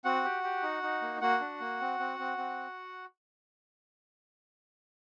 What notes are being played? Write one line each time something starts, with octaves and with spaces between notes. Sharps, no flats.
C4 F#4 F#5
G4
G4
D#4
D#4
A#3
A#3 F#4 F#5
D4
A#3
C4
C4
C4
C4